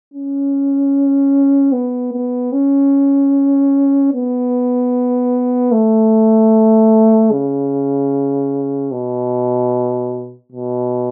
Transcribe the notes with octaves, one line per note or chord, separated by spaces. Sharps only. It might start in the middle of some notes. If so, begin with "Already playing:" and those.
C#4
B3
B3
C#4
B3
A3
C#3
B2
B2